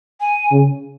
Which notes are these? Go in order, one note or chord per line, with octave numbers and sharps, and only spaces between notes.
G#5
C#3